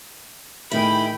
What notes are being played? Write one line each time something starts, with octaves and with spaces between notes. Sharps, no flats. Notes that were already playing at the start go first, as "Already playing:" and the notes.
A2 D#3 E4 G#4 G5 B5